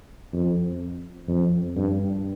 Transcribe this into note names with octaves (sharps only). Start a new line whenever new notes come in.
F2
F2
G2